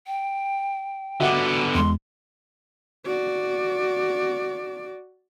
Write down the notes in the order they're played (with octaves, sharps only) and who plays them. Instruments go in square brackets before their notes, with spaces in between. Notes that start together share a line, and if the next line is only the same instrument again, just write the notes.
[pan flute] G5
[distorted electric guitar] D3 B3 [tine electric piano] F#4 [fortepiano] E5 F#5 D6
[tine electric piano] E2 G#3 [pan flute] C6
[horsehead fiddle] F#4 D5